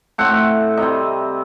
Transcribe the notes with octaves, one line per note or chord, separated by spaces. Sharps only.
A2 A3 C4 F#5
C3 G3 C4 D#5